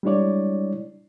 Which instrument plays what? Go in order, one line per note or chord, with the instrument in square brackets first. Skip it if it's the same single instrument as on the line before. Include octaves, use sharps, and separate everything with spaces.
[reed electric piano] G3 G#3 D4 E4 C#5 D5